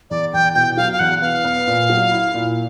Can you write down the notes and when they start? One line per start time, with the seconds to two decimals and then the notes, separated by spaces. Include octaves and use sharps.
0.10 E2 D5
0.33 E2 G5
0.55 B2 G5
0.77 F#3 F5
0.93 F5
0.99 E2 F#5
1.22 B3 F5
1.45 B3
1.67 A#2
1.90 F#3
2.11 E4
2.34 A#2